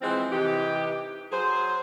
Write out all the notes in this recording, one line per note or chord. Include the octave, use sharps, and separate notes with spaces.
E3 F3 G#3 C4
C3 E3 D#4 G4
F#3 G#4 C5